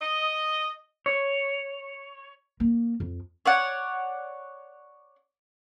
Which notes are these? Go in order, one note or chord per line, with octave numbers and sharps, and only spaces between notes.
D#5
C#5
A#3
F2
C#5 D5 F#5